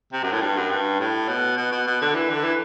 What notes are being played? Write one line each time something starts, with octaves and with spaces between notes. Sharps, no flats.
C3
F#2
A2
G2
F#2
G2
A2
B2
B2
B2
B2
D3
E3
D3
E3